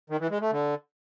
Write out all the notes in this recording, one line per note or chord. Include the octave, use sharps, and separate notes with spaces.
D#3
E3
G#3
A3
D3